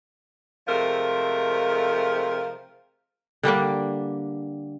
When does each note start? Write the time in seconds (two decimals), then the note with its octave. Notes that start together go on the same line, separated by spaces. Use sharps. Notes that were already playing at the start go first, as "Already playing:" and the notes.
0.68 C3 F3 G#3 A3 A#4
3.43 D3 G3 A#3 D4